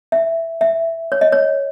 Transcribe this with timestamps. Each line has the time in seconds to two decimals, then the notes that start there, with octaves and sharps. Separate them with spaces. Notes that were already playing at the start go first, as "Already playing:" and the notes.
0.12 E5
0.61 E5
1.12 C#5
1.21 D#5
1.32 C#5